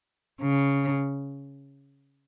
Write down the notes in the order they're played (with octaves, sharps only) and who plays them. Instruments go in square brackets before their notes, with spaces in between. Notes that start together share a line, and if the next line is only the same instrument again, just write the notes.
[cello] C#3